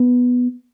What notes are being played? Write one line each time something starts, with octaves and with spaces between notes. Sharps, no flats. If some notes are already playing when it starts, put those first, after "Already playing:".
Already playing: B3